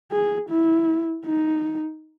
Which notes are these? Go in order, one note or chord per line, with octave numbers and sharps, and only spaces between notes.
G#4
E4
D#4